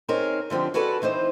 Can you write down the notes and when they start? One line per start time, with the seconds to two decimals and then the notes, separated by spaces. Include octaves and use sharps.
0.09 C4 C#4 D#4 G#4 A#4
0.50 D3 F3 C4 D4 G4
0.74 F#4 G#4 A4 B4 D5 F#5
1.02 E3 C4 D#4 C5